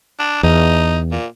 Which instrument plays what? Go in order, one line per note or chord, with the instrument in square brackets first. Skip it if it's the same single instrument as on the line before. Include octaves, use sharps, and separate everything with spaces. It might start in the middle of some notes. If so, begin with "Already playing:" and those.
[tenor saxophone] D4
[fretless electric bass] E2 [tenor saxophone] D#4
[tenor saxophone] A#2